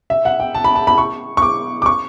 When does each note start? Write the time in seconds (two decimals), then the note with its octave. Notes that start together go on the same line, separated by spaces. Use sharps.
0.10 E5
0.25 F#5
0.40 G5
0.55 A5
0.64 B5
0.75 A5
0.87 B5
0.98 C#6
1.37 C#6
1.42 D6
1.82 D6
1.86 C#6